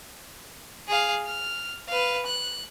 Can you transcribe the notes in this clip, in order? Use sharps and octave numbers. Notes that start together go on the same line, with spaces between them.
G#4 F5
F6
B4 F5
F#6